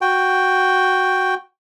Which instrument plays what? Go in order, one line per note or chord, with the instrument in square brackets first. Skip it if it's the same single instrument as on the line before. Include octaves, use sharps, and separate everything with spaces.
[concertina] F#4 G5